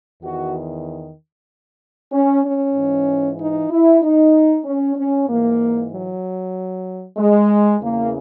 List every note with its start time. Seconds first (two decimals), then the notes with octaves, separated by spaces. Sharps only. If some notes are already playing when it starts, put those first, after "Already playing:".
0.22 E2 D#3 F#4
2.11 C#4
2.44 C#4
2.75 G#2 E3
3.39 D#4
3.70 E4
4.02 D#4
4.65 C#4
4.96 C#4
5.27 G#2 E3 A#3
5.91 F#3
7.17 G#3
7.80 E2 C#3 E3 A#3